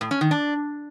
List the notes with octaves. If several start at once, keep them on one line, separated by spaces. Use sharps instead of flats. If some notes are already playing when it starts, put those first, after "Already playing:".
A2
C#4
D#3
D4